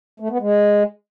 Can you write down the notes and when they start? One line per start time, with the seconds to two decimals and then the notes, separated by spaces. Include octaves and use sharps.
0.20 A3
0.30 B3
0.40 G#3